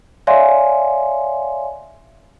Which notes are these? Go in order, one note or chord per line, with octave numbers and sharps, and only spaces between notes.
C#5 D5 E5 F5 G#5 C6